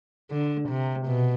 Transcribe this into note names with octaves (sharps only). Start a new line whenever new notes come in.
D3
C3
B2